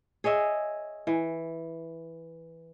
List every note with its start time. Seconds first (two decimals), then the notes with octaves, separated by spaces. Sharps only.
0.24 G#4 C#5 D#5 E5
1.07 E3